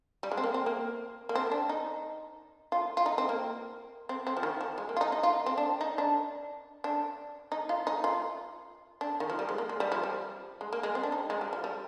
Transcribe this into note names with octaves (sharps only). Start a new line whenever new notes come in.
G3
G#3
C4
A#3
C4
A#3
A#3
C4
D4
D#4
F4
F4
D#4
C4
A#3
C4
C4
F3
D#3
F3
G#3
A#3
F4
D#4
D#4
F4
C4
D4
D#4
D4
D4
D#4
F4
D#4
F4
D4
D#3
F3
G3
G#3
A#3
G#3
G3
F3
G3
G#3
A#3
G#3
C4
D4
D#4
G#3
G3
F3
G3